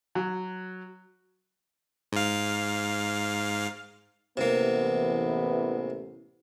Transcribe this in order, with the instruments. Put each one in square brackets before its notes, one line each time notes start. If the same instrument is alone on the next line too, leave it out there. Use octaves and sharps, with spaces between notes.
[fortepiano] F#3
[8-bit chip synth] G#2 F5
[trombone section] A1 E3 B3 [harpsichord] C3 A#3